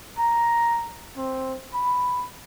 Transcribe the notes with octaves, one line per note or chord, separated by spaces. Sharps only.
A#5
C4
B5